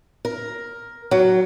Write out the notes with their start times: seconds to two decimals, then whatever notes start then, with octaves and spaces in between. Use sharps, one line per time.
0.25 A#4
1.11 F#3